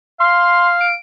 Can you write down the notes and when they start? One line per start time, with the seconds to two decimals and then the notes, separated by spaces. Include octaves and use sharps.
0.20 F5 C6
0.81 D7